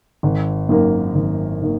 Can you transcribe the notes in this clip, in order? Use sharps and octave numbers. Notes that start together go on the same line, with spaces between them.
G#1
F#2 D#3 A#3
G#1
D#3 A#3